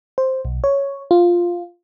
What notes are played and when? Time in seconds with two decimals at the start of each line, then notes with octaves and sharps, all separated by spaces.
0.18 C5
0.45 B1
0.64 C#5
1.11 F4